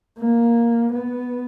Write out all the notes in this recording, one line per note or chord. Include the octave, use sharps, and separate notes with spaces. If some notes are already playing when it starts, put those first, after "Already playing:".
A#3
B3